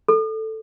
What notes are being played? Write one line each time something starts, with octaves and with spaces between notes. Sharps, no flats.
A4